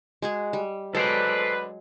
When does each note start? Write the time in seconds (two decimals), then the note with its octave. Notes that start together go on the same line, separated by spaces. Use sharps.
0.22 G#3 F#4 G#4
0.53 G3
0.95 D2 D3 F#3 G#3 A4 B4 C5 D5